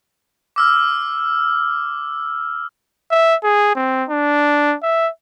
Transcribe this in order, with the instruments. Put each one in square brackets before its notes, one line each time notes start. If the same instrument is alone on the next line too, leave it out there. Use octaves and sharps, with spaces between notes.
[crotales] D6 E6 F6
[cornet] E5
G#4
C4
D4
E5